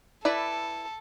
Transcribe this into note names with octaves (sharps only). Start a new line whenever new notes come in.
E4 A4 B4 D5